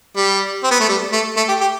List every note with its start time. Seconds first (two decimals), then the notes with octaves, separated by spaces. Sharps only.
0.17 G3
0.64 C4
0.71 B3
0.80 A3
0.89 G3
1.13 A3
1.37 A3
1.49 G4
1.61 G4